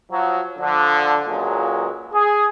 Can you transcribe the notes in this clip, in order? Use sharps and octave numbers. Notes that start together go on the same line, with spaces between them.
F3 F#3
D3 F3
C#2 A#2 F#3 G#3
G#4